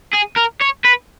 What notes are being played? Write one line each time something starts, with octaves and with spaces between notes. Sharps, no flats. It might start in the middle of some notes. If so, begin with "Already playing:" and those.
G#4
A#4
C#5
B4